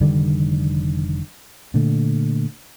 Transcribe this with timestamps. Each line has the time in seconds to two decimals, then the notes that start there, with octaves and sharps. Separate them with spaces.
0.01 F1 D3 D#3 G3
1.74 A#2 D3 A3